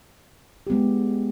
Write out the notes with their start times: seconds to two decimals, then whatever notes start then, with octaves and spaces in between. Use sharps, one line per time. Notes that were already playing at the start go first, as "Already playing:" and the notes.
0.67 G#3 B3 G4